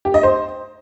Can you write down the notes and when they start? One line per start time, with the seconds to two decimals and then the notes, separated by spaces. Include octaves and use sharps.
0.05 G4
0.14 D#5
0.23 C5